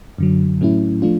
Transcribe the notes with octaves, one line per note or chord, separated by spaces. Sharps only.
F#2 D3 F#3
A2 F#3 A3 C#4 E4
F3 A3 D4 F4